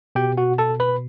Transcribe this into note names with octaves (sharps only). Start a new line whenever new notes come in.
B2 G4 G5
F#4 F#5
A4 A5
B4 B5